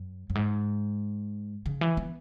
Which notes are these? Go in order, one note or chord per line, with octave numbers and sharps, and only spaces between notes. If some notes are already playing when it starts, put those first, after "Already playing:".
Already playing: F#2
F#2
G#2
C#3
E3
B3